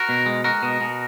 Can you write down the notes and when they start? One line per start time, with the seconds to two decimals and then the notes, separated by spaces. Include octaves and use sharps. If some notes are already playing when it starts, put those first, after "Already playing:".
Already playing: F#4 A#4
0.09 B2
0.26 G#3
0.44 G#3 F#4 A#4
0.62 B2
0.81 B2